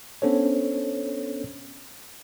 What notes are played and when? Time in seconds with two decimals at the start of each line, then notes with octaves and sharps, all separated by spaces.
0.22 B3 C#4 D4 A4 C5 C#5